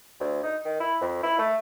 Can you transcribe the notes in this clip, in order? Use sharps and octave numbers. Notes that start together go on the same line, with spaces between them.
D2
D#4
D#3
E4
F2
E4
A3